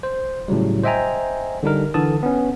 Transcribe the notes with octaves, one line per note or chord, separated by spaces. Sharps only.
C5
A2 C#3 F#3 G3
C5 D#5 E5 G5 G#5 A#5
D3 G3 D4 D#4 A#4
D3 E3 A4 A5 D#6
B3 C#4